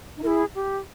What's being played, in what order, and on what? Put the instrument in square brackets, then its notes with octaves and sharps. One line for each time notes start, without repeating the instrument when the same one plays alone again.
[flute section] D#4
[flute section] E4 [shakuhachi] A#4
[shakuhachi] G#4
G4